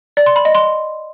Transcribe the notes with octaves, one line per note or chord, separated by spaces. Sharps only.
D5
C6
B5
D#5
C6